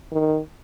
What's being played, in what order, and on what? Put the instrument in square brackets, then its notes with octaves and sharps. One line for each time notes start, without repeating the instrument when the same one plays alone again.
[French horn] D#3